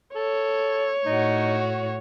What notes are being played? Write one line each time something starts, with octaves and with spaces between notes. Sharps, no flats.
A4 C#5
A2 D#4 F#4